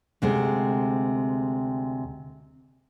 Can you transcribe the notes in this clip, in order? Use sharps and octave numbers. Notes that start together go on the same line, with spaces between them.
D2 C3 G#3 C4